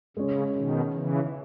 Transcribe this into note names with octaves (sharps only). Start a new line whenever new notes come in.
C#3 G#3 C#4 G#4 C#5
B2 D#3
C#3 E3